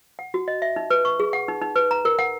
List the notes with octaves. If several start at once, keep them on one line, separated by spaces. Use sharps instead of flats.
F#5
F#4
D#5
E5
D#4
B4
C#6
G#4
F#5
D#4
D#4
B4
A#5
A#4
F#5